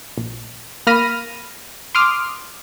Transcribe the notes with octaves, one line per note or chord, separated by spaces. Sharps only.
A#1
A#3 B5 F6 A#6 D#7
C6 D6 D#6 F6